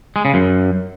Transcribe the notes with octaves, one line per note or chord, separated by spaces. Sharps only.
G#3
C#3
F#2